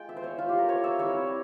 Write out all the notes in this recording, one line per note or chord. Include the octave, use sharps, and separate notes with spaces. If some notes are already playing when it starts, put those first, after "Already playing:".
Already playing: G#3 F4 G5
E5
C5
C#5
F4
G4
A#4
C#5
E5
G3 C4 E4 C#5